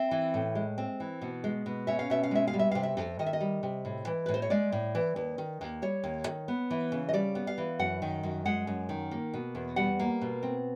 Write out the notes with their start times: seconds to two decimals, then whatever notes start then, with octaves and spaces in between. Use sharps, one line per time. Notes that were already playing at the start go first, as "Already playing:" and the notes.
Already playing: C4 E5
0.11 E3
0.34 A2
0.55 G#3
0.78 C4
1.00 E3
1.22 B2
1.44 G#3
1.66 B2
1.87 C#4 E5
1.99 F5
2.10 B2 E5
2.23 F5
2.31 G#3 E5
2.47 F5
2.54 G3
2.59 E5
2.71 C3 F5
2.83 E5
2.97 F2
3.19 D#3 D#5
3.26 E5
3.33 D#5
3.41 G3
3.63 C3
3.85 A2
4.07 E3
4.26 A2 B4
4.34 C5
4.42 C#5
4.50 G#3 D5
4.72 A2
4.95 E3
5.16 D#2
5.38 D#3
5.61 D#2
5.82 G3 C#5
6.03 D#2
6.27 D#3
6.48 B3
6.70 E3
6.92 C#3
7.09 D#5
7.13 G3 D5
7.35 B3
7.47 F5
7.58 E3
7.79 F#2 F#5
8.02 D#3
8.23 F#2
8.45 G#3 F#5
8.67 F#2
8.89 D#3
9.11 A#3
9.34 B2
9.55 E2
9.76 G3 F#5
9.99 A#3
10.21 B2
10.43 C4